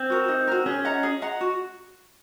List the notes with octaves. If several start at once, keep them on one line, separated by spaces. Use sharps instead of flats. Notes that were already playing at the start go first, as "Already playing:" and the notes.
Already playing: C4
F#4 A#4
D#4
F#4 A#4
C#4 G#4
D#5 F#5 A#5
G#4
D#5 F#5 A#5
F#4